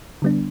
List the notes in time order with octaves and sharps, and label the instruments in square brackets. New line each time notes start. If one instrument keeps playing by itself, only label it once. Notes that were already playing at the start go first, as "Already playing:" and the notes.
[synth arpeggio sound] D3 G3 B3 D4